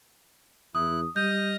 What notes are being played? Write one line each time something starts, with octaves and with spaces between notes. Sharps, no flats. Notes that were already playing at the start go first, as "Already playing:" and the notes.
E2 E4 D#6 F#6
G3 D#5 D#6 F6 G6